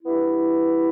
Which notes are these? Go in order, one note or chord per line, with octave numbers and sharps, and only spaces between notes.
G2 E3 B3 E4